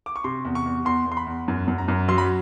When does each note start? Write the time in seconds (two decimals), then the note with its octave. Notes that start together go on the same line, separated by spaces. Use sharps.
0.06 D6
0.16 C#6
0.24 C3 C6
0.45 E2
0.55 C#6
0.66 E2
0.85 E2 C6
1.06 E2
1.12 C6
1.17 B5
1.27 E2
1.48 F#2
1.68 F#2
1.78 A#5
1.88 F#2
2.08 F#3 C6
2.18 B5